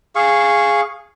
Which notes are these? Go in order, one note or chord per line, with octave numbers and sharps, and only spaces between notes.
G#4 F5 C#6